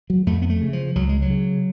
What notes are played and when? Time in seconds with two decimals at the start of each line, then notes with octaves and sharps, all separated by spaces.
0.10 F#3
0.27 F2 A3
0.42 B3
0.50 A3
0.61 C#3
0.73 F3
0.96 C#2 F#3
1.09 G#3
1.22 F#3
1.30 C#3